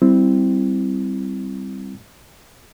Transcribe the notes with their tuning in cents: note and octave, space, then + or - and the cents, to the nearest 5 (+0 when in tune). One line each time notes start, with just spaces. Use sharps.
G3 +0 C4 +0 E4 +5